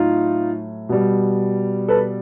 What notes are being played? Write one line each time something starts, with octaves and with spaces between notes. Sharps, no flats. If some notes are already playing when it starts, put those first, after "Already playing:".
Already playing: A2 F#3 D#4 F4
B2 G3
A4 B4